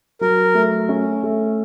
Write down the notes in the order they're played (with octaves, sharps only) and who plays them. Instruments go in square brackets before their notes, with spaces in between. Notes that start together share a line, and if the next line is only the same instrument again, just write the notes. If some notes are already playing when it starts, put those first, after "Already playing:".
[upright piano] F#3 [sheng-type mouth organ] A#4
[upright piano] A3
C#4
A3